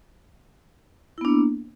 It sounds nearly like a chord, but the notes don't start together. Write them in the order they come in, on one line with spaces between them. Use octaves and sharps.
E4 B3 D4 A#3